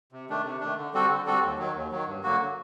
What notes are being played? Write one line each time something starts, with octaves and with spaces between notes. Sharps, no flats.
C3
D#3 A3 D4
C3
D#3 A3 D4
D3
G3 C4 F#4 A4
D3
G3 C4 F#4 A4
D#2
D#3 F#3
D#2
D#3 F#3
G2
D3 F#3 A#3 F#4